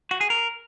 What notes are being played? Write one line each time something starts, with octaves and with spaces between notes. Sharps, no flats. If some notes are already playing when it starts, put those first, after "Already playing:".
F#4
G#4
A#4